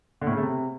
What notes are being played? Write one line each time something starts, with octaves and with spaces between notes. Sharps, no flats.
D3
A2
C#3
A3
C3